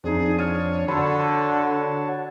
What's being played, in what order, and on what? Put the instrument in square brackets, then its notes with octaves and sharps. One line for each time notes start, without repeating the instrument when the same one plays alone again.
[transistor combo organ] F2 D4 [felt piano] C4 D#4 [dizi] G#4
[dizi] C#5 [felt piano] F6 A6 D#7
[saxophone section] D3 [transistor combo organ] F#4 C#5 A5 [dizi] A4 [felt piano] B5 C6